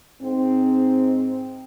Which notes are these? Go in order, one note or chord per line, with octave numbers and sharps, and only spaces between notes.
G#2 C4